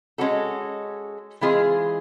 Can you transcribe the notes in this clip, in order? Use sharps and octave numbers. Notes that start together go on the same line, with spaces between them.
G#3 C#4 F#4 A4
E3 G#3 C4 F4 G#4